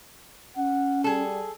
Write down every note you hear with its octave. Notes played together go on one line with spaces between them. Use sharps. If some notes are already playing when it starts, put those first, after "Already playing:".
C#4 F#5
G3 G#4 A4